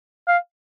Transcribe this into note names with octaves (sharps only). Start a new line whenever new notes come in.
F5